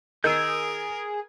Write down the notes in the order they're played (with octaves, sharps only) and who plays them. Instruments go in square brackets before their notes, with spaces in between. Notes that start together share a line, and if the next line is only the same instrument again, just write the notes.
[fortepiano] D#3 D#4 [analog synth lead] G#4 [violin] A#4 [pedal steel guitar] E6 G6